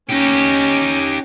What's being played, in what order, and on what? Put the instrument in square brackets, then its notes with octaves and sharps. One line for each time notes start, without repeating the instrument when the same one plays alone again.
[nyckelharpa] C#4 [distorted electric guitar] D#4 G4